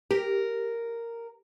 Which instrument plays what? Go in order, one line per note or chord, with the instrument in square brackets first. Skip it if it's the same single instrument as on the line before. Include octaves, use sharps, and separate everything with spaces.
[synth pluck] G4 [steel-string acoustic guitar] A#4